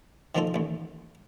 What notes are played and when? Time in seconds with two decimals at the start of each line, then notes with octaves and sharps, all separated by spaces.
0.35 D#3 F3 A#3 D#4 F4 A4
0.54 A1 D#2